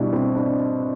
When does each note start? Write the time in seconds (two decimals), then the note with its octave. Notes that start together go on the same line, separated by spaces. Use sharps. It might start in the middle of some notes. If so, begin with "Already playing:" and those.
Already playing: B2 G3 D4 E4
0.13 C4
0.35 D4